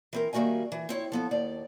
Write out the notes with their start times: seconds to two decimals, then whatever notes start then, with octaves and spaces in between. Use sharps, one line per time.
0.13 E3 C4 A#4
0.33 D#3 G3 A#3 F#4 E5 G#5
0.72 E3
0.89 C4 E4 C#5
1.12 F3 B3 A4
1.31 D#2 D5